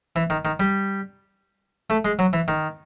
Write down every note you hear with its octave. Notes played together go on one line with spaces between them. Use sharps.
E3
D#3
D#3
G3
A3
G#3
F#3
E3
D#3